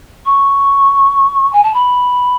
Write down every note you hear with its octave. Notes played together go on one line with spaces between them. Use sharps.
C#6
G#5
A5
B5